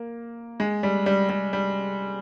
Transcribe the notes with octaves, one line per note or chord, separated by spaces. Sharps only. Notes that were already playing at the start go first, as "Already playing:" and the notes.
Already playing: A#3
G#3
G3
G3
G3
G3